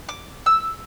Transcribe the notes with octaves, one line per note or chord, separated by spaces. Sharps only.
D6
E6